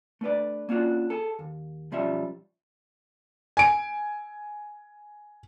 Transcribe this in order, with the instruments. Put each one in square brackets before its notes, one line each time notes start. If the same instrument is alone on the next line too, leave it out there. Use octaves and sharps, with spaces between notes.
[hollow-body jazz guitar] A3 D4 B4 D5
A#3 C#4 D4 F4 F#4
G#4 A4
D#2
B1 F3 G3 C#4 E5
[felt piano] G#5 D7